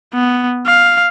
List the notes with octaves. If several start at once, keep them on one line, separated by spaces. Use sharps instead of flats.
B3
F5